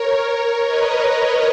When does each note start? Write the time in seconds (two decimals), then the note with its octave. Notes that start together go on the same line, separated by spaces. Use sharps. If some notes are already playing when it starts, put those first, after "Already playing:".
Already playing: A#4 C#5
0.65 B4 D#5